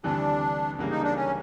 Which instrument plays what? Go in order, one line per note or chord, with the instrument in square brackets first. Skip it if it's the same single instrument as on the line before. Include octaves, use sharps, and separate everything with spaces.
[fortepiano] D2 C3 E3 G3 [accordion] D4
[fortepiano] C#2 C#3 E3 G3 A#3
[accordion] D#4
D4
C#4